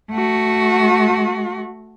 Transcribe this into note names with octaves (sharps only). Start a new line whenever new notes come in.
A3 F#4